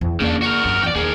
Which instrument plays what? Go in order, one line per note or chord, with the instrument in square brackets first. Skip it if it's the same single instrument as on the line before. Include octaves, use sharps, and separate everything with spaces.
[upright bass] E2
[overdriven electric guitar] C#3 D4 [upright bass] A#3
[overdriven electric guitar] F#4 A#4
[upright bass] G2 F#3
[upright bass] E2 [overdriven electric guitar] D5 G5
[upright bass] D#2 [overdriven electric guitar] G#4 A#4